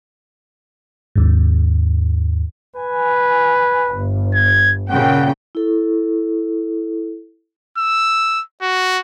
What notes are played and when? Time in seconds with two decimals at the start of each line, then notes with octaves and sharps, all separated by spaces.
1.16 D#2 G#2
2.76 B4 G#5
3.94 G1
4.34 G#6
4.90 A#2 C#3 F#5 G5
5.55 E4 A4
7.78 E6
8.62 F#4